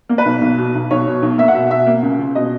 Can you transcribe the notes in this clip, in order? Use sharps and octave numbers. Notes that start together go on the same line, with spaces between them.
A#3
B4
B1
B1
B2
B1
B1 C#5
B2
B1
A#3 E5
F#5
B2 E5
B2 E5
A#3
C#2
C#2
B2 D#5